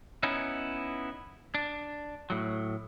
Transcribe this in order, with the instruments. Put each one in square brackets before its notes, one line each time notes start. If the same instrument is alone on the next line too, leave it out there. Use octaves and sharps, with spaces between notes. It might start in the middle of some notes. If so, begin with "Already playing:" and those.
[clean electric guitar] B3 C#4 D#4 E4
D4
A2 F#3